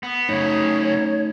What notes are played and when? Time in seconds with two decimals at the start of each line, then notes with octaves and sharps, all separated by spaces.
0.03 B3
0.29 F#2 C#3 A3 D#4 C#5